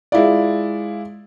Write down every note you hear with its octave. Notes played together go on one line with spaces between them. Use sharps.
G#3 E4 F4 D5